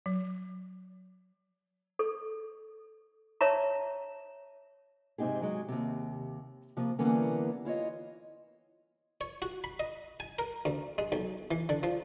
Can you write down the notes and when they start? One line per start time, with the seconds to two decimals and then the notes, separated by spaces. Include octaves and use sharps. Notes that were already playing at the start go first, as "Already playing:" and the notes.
0.06 F#3
1.99 A4
3.41 C#5 E5 A5 A#5
5.18 G#2 C3 C4 D#4 G4 G#4
5.42 F#3 G#3
5.68 D#2 C3
6.77 C3 F3 A#3
6.99 D3 E3 G3 A#3 B3 C#4
7.65 E4 F4 C#5 D#5
9.21 C#5
9.42 F#4
9.64 B5
9.80 D#5
10.20 G#5
10.39 A#4
10.65 D2
10.98 G#3
11.12 B1
11.51 E3
11.69 D3
11.83 F3